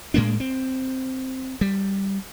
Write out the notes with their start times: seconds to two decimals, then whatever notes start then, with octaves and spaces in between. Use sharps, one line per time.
0.14 A2 G#3 A#3 D4
0.40 C4
1.61 G3